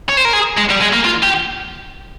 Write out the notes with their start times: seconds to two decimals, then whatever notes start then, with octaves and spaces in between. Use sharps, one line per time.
0.09 C#5
0.17 C5
0.25 A#4
0.33 G#4
0.57 G#3
0.69 G3
0.81 G#3
0.93 A#3
1.05 F4
1.23 G4